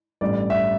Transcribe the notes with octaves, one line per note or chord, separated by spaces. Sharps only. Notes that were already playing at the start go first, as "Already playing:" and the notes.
A1 G2 G3 D5
E5